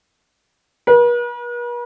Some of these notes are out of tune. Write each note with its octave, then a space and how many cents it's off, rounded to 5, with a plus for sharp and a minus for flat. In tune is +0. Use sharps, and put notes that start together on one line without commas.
B4 -45